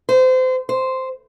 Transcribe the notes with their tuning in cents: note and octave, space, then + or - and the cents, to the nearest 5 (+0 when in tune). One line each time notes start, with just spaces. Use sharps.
C5 -30
C5 -5